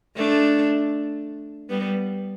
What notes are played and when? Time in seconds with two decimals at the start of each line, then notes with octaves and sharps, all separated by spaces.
0.16 A3 D4
1.69 G3 B3